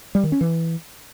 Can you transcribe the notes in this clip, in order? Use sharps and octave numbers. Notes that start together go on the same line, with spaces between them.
G3
D#3
C#4
E3